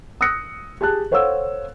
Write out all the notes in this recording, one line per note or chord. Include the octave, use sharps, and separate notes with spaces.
D#6 E6 F#6 A#6 C#7
G4 G#4 A5 F#6
A4 C5 C#5 F5 F#5 E6